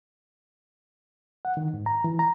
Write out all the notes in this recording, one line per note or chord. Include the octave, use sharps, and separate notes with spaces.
F#5
D#3
G#2
A#5
E3
A#5